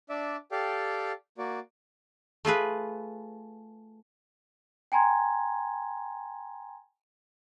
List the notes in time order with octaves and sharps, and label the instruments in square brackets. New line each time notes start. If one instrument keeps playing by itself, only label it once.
[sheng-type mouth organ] D4 D5 E5
G4 A4 D5 F5 G5
A#3 F#4 D5
[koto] A3 F4 G#4 B4
[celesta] G5 G#5 A#5 C6 G#6